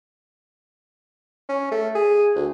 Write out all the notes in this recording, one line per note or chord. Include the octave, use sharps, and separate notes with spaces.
C#4
A3
G#4
D2